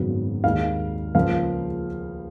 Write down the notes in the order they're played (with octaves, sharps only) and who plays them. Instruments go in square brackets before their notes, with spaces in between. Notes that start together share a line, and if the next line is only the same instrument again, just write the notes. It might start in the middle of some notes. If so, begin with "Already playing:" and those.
Already playing: [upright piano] G#1 F#2 C#3 F#3 B3
D#2 D#3 G#3 F5
C#2 C#3 F3 A#3 F5